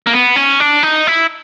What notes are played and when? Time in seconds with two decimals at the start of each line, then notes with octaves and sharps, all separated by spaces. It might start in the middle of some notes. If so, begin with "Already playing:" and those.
0.07 A#3
0.13 B3
0.36 C#4
0.60 D4
0.83 D#4
1.07 E4